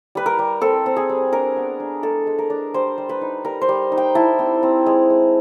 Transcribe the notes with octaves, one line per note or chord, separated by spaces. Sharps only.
G3 B4
A#4
G3
C4 A4
C4
G#4
G3
D4 A#4
B3
D4
G#3 A4
G#3
A#4
D4
G3 C5
G3
B4
D#4
G3 A#4
C5
G3
D#4
G5
E4 A5
C4
C4
G#3
G#3